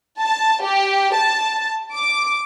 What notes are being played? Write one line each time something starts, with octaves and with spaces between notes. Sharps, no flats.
A5
G4
A5
D6